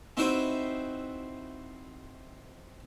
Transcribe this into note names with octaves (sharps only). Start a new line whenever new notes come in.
C4 D#4 E4 F#4 B4 C5